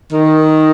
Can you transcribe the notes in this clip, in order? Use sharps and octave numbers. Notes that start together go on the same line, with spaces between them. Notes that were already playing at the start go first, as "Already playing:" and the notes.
D#3